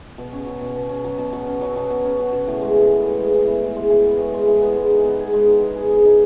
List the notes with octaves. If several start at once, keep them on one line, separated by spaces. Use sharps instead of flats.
B2
C#4
F#3
B2
B2
C#4
F#3
B2
B2
C#4
F#3
B2
B2
C#4
F#3
B2
A2
G#3
E3
B3
A2
G#3
E3
B3
A2
G#3
E3
B3
A2
G#3
E3
B3
G#3
D#4
B3
G#4
G#3
D#4
B3
G#4
G#3
D#4